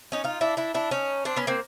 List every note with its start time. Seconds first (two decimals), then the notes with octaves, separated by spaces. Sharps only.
0.12 C#4 D#4
0.24 D#4 F4
0.41 D4 E4
0.57 D4 E4
0.74 D4 E4
0.91 C#4 D#4
1.25 C4 D4
1.37 B3 C#4
1.47 A#3 C4